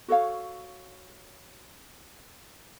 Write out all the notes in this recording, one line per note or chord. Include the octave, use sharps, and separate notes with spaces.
F#4 A4 C#5 F5